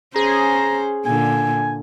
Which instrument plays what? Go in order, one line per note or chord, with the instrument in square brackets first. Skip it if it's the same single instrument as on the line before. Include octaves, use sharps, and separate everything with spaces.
[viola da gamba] C#4 C5 [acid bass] G#4 [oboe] A#5
[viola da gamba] A#2 D3 [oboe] G#5